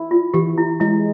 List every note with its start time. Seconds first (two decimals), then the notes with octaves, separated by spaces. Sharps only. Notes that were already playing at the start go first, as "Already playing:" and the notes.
Already playing: E4
0.11 F4
0.34 E3 G4
0.58 E4
0.80 G#3 E4